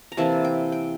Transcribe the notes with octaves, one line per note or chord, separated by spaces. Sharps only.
A#5
C3 E3 A#3 E4 A5
G5
G5